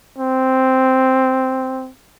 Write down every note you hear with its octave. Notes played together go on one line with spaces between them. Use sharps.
C4